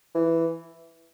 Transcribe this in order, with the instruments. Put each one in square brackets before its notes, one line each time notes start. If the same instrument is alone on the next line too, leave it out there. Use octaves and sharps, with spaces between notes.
[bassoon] E3